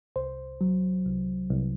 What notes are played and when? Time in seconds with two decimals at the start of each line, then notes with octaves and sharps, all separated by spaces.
0.16 C2 C5
0.61 F#3
1.06 C2
1.50 C2